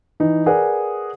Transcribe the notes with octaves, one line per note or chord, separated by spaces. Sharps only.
E3 D#4
G#4 A#4 B4 D5 F#5